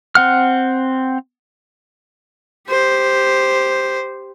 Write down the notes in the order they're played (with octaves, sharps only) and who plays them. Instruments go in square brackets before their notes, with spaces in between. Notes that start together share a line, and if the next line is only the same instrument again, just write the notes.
[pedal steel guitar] C4 F#5 F6
[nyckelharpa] G4 C5